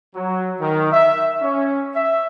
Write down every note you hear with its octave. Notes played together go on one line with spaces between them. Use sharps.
F#3
D#3
E5
C#4
E5